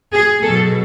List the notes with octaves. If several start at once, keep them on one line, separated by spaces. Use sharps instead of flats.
G#4
B2 F#3 A4